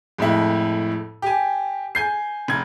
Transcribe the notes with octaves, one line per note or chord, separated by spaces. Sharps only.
F2 A2 G#3 E4
G4 G#5
G#5 G6 C7
F1 G#6